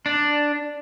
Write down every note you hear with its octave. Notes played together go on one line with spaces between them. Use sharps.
D4